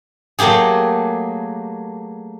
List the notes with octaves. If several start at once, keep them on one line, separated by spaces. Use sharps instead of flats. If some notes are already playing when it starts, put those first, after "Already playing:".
F#3 A3 A#3 G4 G#4